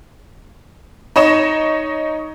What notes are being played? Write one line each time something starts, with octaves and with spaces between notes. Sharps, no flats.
D#4 C#5 D#5 E7